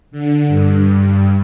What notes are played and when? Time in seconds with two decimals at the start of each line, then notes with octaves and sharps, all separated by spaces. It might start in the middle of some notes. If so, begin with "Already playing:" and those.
0.11 D3
0.48 G2